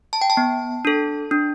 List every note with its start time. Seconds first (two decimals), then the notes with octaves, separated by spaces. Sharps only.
0.13 A5
0.21 G5
0.30 A5
0.37 B3
0.85 D4 A4
1.31 D4